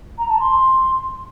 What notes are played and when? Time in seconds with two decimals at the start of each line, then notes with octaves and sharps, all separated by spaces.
0.18 A#5
0.29 A5
0.39 C6